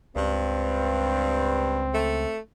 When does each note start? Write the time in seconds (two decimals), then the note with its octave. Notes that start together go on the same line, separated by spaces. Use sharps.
0.16 C#2 G2 C4
1.94 A3